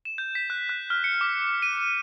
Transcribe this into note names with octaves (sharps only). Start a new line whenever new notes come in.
E7
G6
B6
F#6
F#6
F6
C#7
D6
D#7